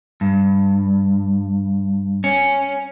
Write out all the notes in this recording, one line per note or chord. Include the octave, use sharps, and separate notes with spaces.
G2
C#4